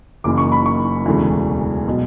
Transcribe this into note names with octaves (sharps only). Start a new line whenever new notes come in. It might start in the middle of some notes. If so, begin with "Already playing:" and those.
F#1 F#2 E3 A#3 D6
C#6
B5
C#6
E1 D2 C#3 E3
B2 F#3